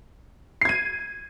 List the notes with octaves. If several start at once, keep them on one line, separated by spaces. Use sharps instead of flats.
G#6 C7 D#7